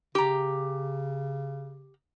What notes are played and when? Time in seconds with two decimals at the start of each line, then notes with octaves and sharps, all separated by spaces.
0.15 C#3 G4 A#5